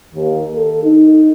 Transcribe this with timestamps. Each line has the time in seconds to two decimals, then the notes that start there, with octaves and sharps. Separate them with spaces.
0.14 D#2
0.54 A4
0.84 D#4